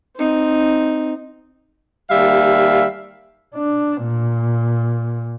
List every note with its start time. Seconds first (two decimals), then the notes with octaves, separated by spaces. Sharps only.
0.16 C4 D#4
2.10 D#2 G3 E5 F5
3.55 D4
4.04 A#2